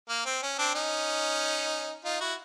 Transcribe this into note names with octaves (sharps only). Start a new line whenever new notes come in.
A#3
C4
C#4
C4 D4
C#4 D#4
D#4 F4
E4 F#4